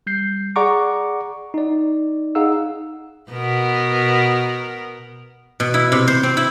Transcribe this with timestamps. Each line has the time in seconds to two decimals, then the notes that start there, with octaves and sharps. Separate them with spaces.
0.07 G3 G6 C7
0.56 G#4 D5 F#5 A#5 C#6 D6
1.54 D#4 D5
2.35 D#4 G#4 F5 F#5 E6
3.30 B2 B3 A#4
5.60 B2
5.74 E4
5.92 C3
6.08 C5
6.23 C4
6.37 E4